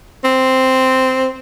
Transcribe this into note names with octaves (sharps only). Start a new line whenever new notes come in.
C4